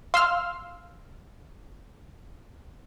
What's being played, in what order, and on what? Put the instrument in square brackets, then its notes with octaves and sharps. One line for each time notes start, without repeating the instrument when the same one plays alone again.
[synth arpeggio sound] F5 E6 [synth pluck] C6 F6